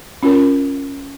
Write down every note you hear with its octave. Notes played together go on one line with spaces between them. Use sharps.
C#4 F4 A#4